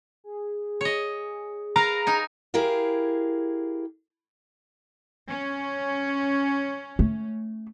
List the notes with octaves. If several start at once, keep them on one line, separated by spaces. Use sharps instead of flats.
G#4
C#5 D#5
A#4 B4 F5 A#5
D#4 G#5
E4 G4 G#4 A#4 F5
C#4
A3